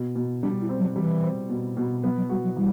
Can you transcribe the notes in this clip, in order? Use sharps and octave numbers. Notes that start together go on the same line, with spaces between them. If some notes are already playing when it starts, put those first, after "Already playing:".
Already playing: B2
B2
G3 D4
E4
C4
F#3
E3 G3
C4
B2
B2
F#3 B3
F#3
G3 F#4
F#3
E3 G3